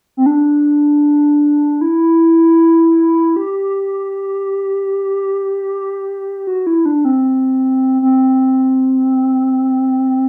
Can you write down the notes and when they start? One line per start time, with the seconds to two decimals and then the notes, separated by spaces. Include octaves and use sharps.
0.17 C4
0.26 D4
1.81 E4
3.36 G4
6.47 F#4
6.67 E4
6.86 D4
7.05 C4
8.02 C4